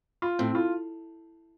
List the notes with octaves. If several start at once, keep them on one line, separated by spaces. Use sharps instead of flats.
F4
A2 C4
F4